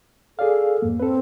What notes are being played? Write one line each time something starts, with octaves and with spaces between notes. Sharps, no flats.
G#4 A4 D5 F5
F2 G#2 A#3
C4 A4 B4